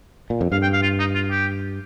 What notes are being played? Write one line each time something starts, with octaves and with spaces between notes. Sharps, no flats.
A#2
F2
G2 F5
G5
F5
F4
D#4
F4
G4